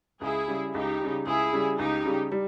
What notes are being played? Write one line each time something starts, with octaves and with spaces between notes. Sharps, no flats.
C#2 E4 G#4
C#3 G3
C#2 D#4 G4
C#3 G3
C#2 E4 G#4
C#3 G3
C#2 D#4 G4
C#3 G3
G3